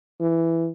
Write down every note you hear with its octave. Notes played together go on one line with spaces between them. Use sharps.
E3